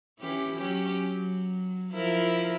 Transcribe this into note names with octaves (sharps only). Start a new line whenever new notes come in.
E3 C#4 G4
F#3 C#4 G4
F#3
F3 E4 A#4